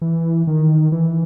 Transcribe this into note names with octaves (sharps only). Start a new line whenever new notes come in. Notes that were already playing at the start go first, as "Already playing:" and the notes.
E3
D#3
E3